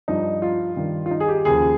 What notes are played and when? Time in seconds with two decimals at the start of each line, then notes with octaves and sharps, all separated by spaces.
0.08 G2 F3 D#4
0.42 F4
0.76 G2 D#3
1.06 F4
1.11 D#4
1.20 G#4
1.28 G4
1.45 D#2 C#3 F3 G#4